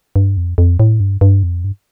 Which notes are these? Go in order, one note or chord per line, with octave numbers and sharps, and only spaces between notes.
G2
F2
F2
A2
G2
G2
F2
G2